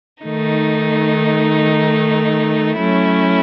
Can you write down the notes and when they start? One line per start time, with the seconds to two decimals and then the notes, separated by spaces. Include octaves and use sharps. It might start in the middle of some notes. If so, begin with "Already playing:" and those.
0.24 D#3 A3 D#4
2.79 F#3 A3 C#4 E4